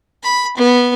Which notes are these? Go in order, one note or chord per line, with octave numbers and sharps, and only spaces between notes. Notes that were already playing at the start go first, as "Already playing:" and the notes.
B5
B3